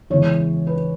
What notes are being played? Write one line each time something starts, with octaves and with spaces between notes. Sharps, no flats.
E2 C#3 E3 G#3 C#5
B4